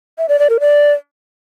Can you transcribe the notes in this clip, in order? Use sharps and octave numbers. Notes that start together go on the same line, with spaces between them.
E5
D5
D5
A#4
D5